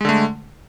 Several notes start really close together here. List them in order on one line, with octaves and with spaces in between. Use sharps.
G#3 D3 A3